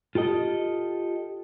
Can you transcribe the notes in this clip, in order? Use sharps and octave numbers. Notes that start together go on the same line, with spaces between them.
F4 G4 A4 D#5